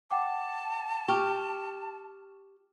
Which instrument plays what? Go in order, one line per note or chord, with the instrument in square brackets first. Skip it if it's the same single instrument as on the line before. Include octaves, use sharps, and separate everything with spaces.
[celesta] F#5 G5 D6 [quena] A5
[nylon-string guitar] G4 [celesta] C#6 F6